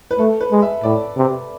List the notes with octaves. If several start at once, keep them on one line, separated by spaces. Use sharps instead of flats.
B4
A3 A4
B4
G#3
E5
A2 D5
C3